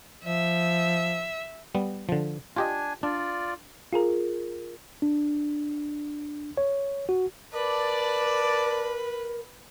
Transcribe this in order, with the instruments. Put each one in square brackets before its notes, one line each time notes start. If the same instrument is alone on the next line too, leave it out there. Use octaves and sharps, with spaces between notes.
[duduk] F3 [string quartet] E5
[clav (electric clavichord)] G3 B3
D3 F3
[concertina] D4 G#5 [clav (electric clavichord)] F4 G4 D#5
[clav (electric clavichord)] D4 [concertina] F4 D5
[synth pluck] F4 G#4 A#4
[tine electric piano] D4
C#5
F#4
[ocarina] A#4 [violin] B4 [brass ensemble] D5 A5